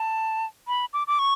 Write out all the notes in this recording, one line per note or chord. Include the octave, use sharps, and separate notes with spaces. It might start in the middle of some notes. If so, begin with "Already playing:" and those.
Already playing: A5
B5
D6
D6
C#6